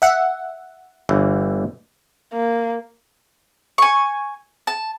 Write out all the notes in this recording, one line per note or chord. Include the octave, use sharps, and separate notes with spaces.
E5 F#5
G1 E3
A#3
G#5 C#6
A5